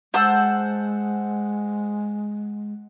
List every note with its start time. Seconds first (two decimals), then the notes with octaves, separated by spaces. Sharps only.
0.14 G#3 C5 F#5 A5 E6